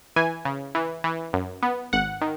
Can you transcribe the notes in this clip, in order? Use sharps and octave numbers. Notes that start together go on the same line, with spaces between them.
E3 G#5
C#3
E3
E3
F#2
B3
G#1 F#5
D#3